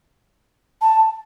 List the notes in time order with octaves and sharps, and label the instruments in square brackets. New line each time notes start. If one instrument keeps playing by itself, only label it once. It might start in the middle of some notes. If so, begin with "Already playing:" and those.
[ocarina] A5